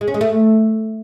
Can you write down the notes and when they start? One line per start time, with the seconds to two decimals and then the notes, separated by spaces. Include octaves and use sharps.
0.01 G#3
0.08 C#4
0.14 G#3
0.21 A3